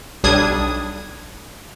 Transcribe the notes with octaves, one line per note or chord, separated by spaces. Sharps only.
B1 G3 D4 D#6 G#6